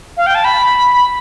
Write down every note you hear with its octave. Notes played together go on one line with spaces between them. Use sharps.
F5
G5
A5
B5